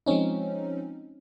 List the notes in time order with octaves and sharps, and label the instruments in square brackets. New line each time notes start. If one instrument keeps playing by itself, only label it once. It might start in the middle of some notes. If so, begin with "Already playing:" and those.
[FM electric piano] F3 G#3 C4 C#4 D#4